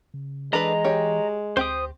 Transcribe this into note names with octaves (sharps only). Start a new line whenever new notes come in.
C#3
E3 G#3 D4 A4 B4 D#5 A#5
G4 C#5
D2 C4 G4 C5 D#6